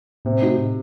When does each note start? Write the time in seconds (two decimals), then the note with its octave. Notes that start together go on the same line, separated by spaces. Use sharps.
0.25 A2 C3
0.42 A3 D#4 F#4
0.58 A2